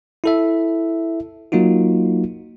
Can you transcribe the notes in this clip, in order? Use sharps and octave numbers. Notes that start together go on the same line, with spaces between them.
E4 A4 E5
F#3 A#3 D#4 F4 F#4